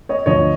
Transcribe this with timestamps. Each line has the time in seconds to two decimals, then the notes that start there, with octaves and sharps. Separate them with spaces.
0.09 C#5 D#5
0.26 D2 D3 F3 C#5 D#5